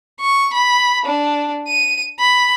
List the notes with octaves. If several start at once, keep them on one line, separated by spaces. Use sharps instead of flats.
C#6
B5
D4
D#7
B5